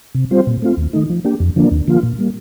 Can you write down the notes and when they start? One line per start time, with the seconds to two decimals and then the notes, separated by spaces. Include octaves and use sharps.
0.15 C3
0.31 G3 C4 F4 C5
0.47 A#2
0.62 A3 C4 F4
0.77 D#2
0.93 D#3 A3 D#4
1.10 F3
1.24 A#3 D4 G4
1.40 F2
1.56 D3 F3 A#3 D4
1.71 D#2
1.88 D3 F3 A#3 F4
2.03 A#2
2.19 G3 A#3